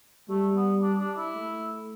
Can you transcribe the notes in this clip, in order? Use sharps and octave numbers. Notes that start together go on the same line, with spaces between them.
G3 A3
B3
D4
D4
E4
A3